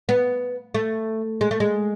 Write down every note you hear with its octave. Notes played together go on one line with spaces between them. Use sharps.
B3
A3
G#3
A3
G#3